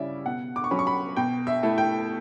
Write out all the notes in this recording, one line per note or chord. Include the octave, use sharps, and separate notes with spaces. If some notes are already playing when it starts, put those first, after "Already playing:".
Already playing: C#3 G3 C#4 E4 D5 E5
B2 F#5
D6
C#6
F#3 C#4 B5
C#6
B5
B2 G5
E5
A3 E4
G5